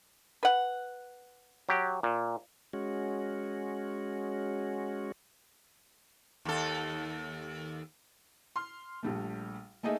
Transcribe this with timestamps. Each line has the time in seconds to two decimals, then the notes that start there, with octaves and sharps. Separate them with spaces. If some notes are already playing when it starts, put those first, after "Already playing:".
0.43 B4 F#5
1.69 F#3 G4
2.03 A#2
2.73 G#3 C#4 F#4
6.45 D#2 A4
8.56 C6 F6
9.03 A#1 G3 A3
9.83 A3 A#3 D#4 G#4 D#5 E5